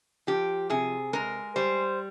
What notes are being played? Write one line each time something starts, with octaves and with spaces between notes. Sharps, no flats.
F3 G4
C3 G#4
G#3 A#4
G3 C5